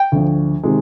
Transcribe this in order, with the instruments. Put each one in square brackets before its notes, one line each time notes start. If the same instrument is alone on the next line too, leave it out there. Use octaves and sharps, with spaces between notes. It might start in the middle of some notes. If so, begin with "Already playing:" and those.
Already playing: [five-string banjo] G5
[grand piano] D2 D3 F3
C3 D#3 G#3